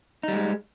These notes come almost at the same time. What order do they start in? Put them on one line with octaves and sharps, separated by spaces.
D#4 G3 G#3